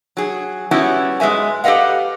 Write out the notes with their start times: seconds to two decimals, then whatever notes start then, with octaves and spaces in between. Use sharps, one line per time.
0.17 F#3 G#4
0.71 G3 B3 C#4 E4 F#4
1.20 G#2 G#3 B4 E5 G#5
1.64 G4 A4 B4 D#5 F5 F#5